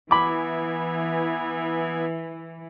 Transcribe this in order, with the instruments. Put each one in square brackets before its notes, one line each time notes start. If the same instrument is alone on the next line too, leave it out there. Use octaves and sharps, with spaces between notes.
[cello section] E3 [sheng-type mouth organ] B3 E4 G#5 [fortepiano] B5 D6